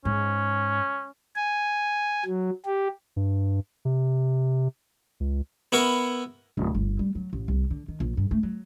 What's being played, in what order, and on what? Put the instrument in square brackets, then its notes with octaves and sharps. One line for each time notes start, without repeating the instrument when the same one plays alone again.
[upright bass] G#2 [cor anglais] C#4
[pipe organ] G#5
F#3
G4
[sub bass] G2
C3
C#2
[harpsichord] B3 E4 A#4 C#6
[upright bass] D1
G1
G3
F#3
A1
C2
D3
D#3
A#1
G2
A3
F#3